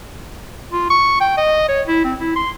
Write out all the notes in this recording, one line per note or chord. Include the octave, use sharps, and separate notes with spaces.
F4
C#6
G5
D#5
C#5
E4
C4
E4
C6